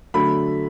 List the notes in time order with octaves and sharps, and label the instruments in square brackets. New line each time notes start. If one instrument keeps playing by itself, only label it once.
[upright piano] D3 F#3 A3 B5